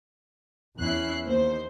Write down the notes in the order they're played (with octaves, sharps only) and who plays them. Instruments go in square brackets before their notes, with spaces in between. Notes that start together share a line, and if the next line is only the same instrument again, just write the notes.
[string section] E2 C#4 E4 F#6 C7
D#2 C5